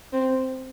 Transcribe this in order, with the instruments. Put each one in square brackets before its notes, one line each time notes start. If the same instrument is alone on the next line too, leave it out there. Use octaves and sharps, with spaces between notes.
[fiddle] C4